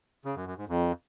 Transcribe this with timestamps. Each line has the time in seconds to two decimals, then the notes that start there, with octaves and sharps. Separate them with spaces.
0.25 C#3
0.36 F#2
0.47 F#2
0.58 G#2
0.69 F2